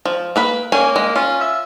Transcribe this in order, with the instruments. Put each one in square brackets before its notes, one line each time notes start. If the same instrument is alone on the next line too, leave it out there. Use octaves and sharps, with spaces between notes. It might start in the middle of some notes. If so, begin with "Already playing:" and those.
[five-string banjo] F3
A#3 B4 B5
[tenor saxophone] A#3 [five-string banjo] C#4 G#5
[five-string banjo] G#3
[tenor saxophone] C#4 [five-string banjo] F4
[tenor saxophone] E5